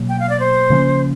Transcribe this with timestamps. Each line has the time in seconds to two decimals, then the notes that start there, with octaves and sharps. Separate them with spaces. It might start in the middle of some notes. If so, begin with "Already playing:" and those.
Already playing: B2 F#3 A#3
0.09 G5
0.20 F5
0.29 D5
0.40 C5
0.70 C#3 F3 A#3 C#4